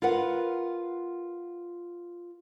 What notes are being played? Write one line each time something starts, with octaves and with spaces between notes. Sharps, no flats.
F4 A#4 B4 F#5